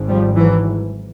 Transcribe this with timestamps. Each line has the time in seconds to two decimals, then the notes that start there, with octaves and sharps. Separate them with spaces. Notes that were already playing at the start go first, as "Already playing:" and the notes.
Already playing: G#1 G#2
0.08 F3 G3
0.36 E3 F#3